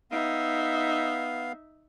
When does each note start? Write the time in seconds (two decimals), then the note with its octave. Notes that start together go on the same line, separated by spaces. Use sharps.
0.12 B3 D#4 E5 F5